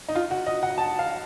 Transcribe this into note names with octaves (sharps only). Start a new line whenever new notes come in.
D#4
F4
F#4
D#5
F#5
A5
F5